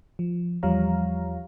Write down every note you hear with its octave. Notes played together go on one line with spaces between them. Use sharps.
F3
E2 F3 G3 C#5 F5 A#5